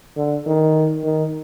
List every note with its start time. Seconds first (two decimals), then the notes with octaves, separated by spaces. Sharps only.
0.17 D3
0.46 D#3
1.04 D#3